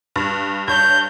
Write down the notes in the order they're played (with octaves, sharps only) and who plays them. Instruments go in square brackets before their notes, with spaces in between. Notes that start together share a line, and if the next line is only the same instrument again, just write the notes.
[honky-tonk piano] G2
[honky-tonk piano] G2 C#5 A5 [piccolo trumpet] G6